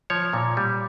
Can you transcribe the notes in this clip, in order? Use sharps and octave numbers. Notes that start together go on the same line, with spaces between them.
F3 C#5
A#2
G3